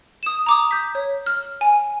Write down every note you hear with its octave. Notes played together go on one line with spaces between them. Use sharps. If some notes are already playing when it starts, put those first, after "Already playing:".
D#6 E7
A#5 D6 D#6
G6 B6
C#5
F6
G#5